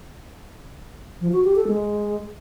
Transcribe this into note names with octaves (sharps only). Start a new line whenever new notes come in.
F3
F#4
G4
A4
G#3